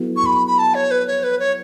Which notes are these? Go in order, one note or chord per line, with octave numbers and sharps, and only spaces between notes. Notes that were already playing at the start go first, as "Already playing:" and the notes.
Already playing: F#3 B3 E4 A4
C#6
B5
B5
A5
C#5
B4
C#5
B4
C#5